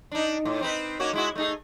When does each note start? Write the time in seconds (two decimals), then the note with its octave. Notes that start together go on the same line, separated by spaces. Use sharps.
0.12 D4 D#4
0.45 A2
0.61 C4 D#4 B4
1.00 A#3 C#4 F#4
1.13 G#3 E4 F#4
1.35 A3 D#4 G#4